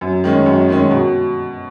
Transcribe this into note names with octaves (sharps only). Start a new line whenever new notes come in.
F#2
D#3 G#3 C#4
F#2
D#3 G#3 C#4
B2